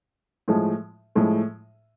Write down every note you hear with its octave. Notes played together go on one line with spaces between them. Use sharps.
A2 F3 G#3
A2 F3 G#3